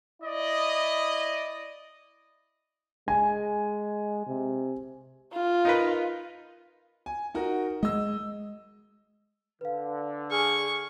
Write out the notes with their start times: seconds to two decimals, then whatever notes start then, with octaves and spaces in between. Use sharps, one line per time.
0.23 E4 D5 D#5
3.08 G#3 G#5
4.26 C3
5.33 F4
5.65 D#4 A#4 B4
7.06 G#5
7.34 D#4 F#4 A#4
7.83 G#3 D#5 E6
9.61 D3 B4 F5
10.31 G#4 C#6 F6